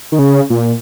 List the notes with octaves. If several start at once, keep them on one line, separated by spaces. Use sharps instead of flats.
D#3
C#3
A#2